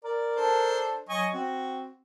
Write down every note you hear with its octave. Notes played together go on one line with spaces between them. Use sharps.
A#4 D5
D4 A4 C5
F#3 D#5 G#5 C#6
C4 F#4